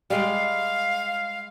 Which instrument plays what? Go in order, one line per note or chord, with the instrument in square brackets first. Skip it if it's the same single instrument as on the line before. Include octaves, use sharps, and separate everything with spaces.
[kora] G3 G#3 [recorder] F5